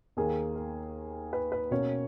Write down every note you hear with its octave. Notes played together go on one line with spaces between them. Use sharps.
D#2 D#3 A#3 G#4
A#4
B4
B4
B2 A#3 C#4 C#5